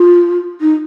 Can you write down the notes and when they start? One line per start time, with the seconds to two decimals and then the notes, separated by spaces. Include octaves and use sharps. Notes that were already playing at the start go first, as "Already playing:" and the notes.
Already playing: F4
0.61 D#4